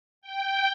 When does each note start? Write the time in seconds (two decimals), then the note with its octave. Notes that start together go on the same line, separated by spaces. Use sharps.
0.22 G5